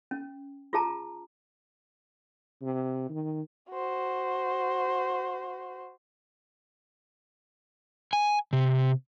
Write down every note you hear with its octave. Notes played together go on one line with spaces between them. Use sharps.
C#4
F4 G#4 A5 A#5
C3
D#3
F#4 C5
G#5
C3